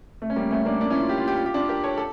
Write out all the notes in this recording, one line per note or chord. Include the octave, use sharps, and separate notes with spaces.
A3
C#4
G3 A#3
A3 C#4
A#3 D4
A#3 D4
C#4 E4
F4
G4
F4
G4
F4
G4
D4 F4
G4 A#4
A4 C#5
A4